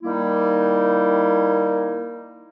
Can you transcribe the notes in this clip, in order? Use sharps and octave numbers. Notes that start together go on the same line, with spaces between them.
D#3 G3 A#3 D#4 E4